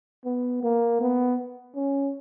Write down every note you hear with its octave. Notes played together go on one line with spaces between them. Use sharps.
B3
A#3
B3
C#4